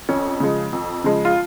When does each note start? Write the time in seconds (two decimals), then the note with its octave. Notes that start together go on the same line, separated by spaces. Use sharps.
0.09 F2 C#4
0.40 C#3 F3 G#3
0.73 F2
1.04 C#3 F3 G#3
1.25 F4